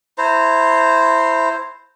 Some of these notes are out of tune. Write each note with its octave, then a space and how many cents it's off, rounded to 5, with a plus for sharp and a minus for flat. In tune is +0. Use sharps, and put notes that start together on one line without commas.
E4 +0 C5 +0 A#5 -25